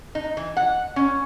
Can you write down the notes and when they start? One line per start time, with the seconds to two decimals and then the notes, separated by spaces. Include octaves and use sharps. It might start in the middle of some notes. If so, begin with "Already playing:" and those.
0.15 D#4
0.37 E3
0.57 F#5
0.96 C#4